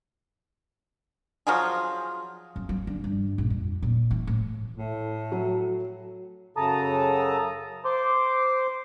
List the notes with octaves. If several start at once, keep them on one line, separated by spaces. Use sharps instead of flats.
F3 F#3 F4 G#4
F#2
F#3
D3
G2
A#1
F2
A#2
E3
A2
A2
F#3
F#2 C#3 A4 A5 A#5 D#6
C5 C6 D6